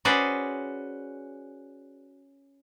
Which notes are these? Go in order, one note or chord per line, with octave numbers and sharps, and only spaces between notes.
C#4 F#4 G#4 B4 C5 D5